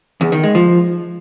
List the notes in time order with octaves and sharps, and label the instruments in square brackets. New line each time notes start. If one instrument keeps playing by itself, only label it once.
[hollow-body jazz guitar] E2
D#3
G#3
F3